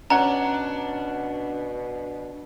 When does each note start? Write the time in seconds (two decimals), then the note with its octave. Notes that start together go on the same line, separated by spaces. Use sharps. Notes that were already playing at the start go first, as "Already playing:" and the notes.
0.10 B2 C#4 D4 F#5 A#5